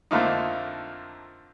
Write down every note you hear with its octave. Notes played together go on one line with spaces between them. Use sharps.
F2 D3 F3 A3 A#3 D#4